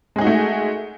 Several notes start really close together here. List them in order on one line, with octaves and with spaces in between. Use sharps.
G#3 G#4 D#4 F#4 A3